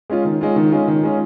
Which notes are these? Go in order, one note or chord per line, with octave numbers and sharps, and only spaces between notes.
G#3 C#4 F4
D#3
G#3 C#4 F4
D#3
G#3 C#4 F4
D#3
G#3 C#4 F4